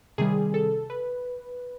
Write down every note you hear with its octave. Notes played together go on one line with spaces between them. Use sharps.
C3 D#3 G3 G#4
A4
B4